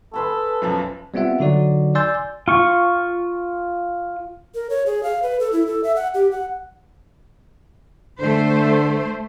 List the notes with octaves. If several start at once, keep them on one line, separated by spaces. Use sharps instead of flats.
G#4 A4 B4 C6
B1 F#2 F3
G3 B3 C4 F4 E5 F#5
D3 F#3 D#4 F#4 D5
D5 G#5 C6 E6 G6 A6
F4 C#6
A#4
C#5
G#4
F5
B4
A4
E4
A4
E5
F#5
G4
F#5
D3 A3 C5